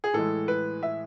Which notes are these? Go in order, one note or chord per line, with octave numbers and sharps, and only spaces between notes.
G#4
A2 E3 G#3 A4
B4
E5